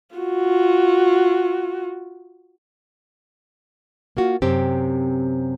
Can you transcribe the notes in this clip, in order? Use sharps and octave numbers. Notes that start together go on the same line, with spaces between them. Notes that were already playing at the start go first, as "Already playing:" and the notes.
F4 F#4
A#3 F4 F#4
F#2 C3 C4 G4